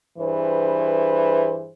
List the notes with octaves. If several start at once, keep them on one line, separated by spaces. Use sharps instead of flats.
G2 E3 G#4 B4 C5